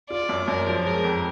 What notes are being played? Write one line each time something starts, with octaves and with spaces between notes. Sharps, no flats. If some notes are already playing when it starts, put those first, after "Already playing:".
F4 D5
F#2
F#2 A#4
F3
G#3 A#4
F2